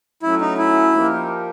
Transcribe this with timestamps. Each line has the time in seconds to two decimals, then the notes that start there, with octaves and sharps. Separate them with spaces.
0.23 F#3 A3 C#4 E4
0.41 D#4
0.58 E4
0.93 F3 A#3 D#4 G4 A#4